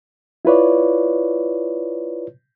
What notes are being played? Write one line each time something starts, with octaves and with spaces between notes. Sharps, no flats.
E4 F4 B4 C#5 D5